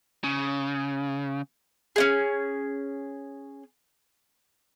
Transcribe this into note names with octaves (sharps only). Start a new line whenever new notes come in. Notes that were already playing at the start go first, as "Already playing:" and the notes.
C#3
C#4 D4 G#4